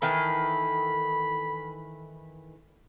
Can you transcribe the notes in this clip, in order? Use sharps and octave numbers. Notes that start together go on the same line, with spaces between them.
D#3 E3 A4 B5